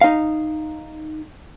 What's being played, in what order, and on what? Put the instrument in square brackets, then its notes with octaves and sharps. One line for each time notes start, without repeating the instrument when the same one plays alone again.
[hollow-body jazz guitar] D#4 F5